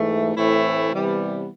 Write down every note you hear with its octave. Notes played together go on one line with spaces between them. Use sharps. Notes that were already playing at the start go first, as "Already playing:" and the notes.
Already playing: G#2 E3 A3
A2 E3 A3 C4 E4
C3 E3 G3 B3